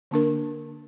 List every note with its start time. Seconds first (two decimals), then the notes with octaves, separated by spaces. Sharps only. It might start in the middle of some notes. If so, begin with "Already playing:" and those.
0.11 D3 A#3 D4 A#4